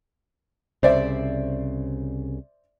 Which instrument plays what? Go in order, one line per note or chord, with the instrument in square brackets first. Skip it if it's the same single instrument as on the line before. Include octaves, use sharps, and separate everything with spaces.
[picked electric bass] C2 C#3 [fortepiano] C5 D5 E5